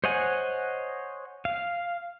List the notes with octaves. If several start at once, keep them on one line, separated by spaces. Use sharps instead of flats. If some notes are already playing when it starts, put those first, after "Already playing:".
C5 C#5 D#5 F#5 G#5
F5